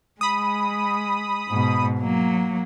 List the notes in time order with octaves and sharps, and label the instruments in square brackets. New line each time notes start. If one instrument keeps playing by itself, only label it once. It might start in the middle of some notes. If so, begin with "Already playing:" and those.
[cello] G#3 [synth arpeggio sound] B5 D#6
[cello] G#2 B2
F#3 A#3